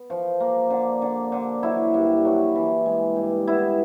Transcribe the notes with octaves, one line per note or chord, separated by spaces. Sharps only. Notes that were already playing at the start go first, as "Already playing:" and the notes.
Already playing: B3
F3
A#3
D3
D3
D3
F#3 E4
G2
F#3
E3
G#3
G2
B3 E4